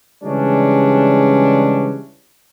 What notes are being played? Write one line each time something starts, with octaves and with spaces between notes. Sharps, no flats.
C#3 E3 G3 G#3 C#4 D4